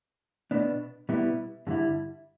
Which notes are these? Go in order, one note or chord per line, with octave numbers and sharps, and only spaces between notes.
B2 B3 D4
B2 G3 B3 E4
G2 D3 G3 E4